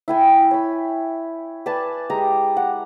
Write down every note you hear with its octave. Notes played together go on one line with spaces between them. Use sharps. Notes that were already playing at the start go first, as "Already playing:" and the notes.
E4 G5 G#5
C#5 B5
B4 D5 G#5 A5
G#3 G4 A#5
F#5